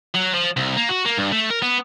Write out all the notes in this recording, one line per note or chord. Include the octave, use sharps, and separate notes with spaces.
F#3
F3
C2
A#3
F#4
A#3
G2
A3
A#4
B3